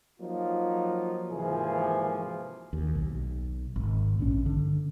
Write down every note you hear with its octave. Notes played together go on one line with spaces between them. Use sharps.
F3 F#3 A#3 D#4 F4
G#1 C3 E3 F3 A#3 G#4
D#2
B1
G#1
A#1 G2 C#4
G2 D3